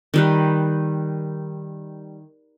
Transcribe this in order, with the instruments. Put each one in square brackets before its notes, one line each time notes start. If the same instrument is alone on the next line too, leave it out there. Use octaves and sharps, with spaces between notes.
[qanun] D#3 G3 B4